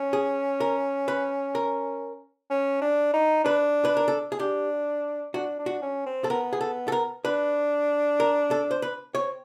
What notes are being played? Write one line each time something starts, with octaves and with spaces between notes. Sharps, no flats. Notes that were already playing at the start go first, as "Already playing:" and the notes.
Already playing: C#4
G#4
A#4
B4
A#4
C#4
D4
D#4
D4 B4
B4
A#4
A4
G#4
D4 G4
D4 F#4
D4
F#4
C#4
C4
A4
B3 A#4
G#4
A4
A4
A#4
D4 B4
A#4
A4
C5
B4
C4 C#5